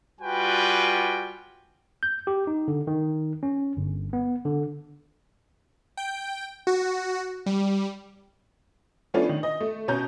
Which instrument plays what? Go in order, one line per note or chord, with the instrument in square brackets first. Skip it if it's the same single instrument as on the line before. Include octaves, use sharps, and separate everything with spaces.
[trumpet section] G3 F4 F#4 B4 G5 G#5
[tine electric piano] G6
G4
D#4
D3
D#3
C#4
G1
B3
D3
[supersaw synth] G5
F#4
G3
[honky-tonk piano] F3 A3 B3 C#4 D4 F4
D#3
D#5
A3
B2 C#4 A#5 G6